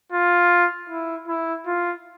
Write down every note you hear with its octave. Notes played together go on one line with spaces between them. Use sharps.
F4
E4
E4
F4